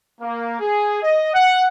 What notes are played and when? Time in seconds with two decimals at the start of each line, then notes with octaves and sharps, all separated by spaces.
0.21 A#3
0.60 G#4
1.03 D#5
1.34 F#5